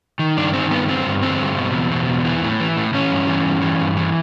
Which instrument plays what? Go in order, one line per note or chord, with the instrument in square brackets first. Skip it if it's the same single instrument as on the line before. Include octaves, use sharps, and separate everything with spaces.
[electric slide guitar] D#3
G2 D4
D#3 C4
G2 B3
D3 C4
G2
D3 C4
G2
B2
E2
B2
E2
E3
A2
E3
A2
E3 C#4
G2
E3
G2
E3
G2
E3